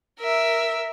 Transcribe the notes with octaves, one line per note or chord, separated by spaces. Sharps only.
A#4 E5